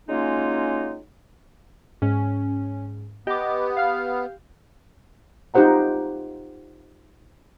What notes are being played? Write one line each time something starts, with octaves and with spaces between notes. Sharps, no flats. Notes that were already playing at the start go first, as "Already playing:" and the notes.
F#3 G#3 A#3 C#4 D#4 F4
G#2 C#4
B3 G4 D#5 D6
F5 F6
D#4 F4 G4 C5 F#5 A#5